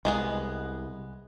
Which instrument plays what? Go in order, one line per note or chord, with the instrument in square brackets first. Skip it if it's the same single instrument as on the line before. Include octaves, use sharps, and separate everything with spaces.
[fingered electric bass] C2 [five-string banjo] G#3 B3 G#4